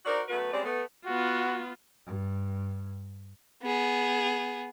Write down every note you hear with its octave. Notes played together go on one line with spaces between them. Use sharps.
D#4 F#4 G#4 A#4 C5 D5
F#2 A3 B3 F#4 B4
G3 G#3 C4 C#4 G4 D5
A3 B3
B3 F4 F#4
G2
B3 G#4